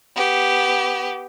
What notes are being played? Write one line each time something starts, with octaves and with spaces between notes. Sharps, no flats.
B3 G4